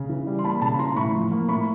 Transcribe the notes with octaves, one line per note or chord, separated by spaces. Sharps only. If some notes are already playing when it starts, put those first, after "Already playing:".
Already playing: C#3
E3
G3
C6
A#3 A5 B5
C#3 A5 B5
E3 A#5 C6
A2 B5 C#6
F3
A#3
A2 B5 C#6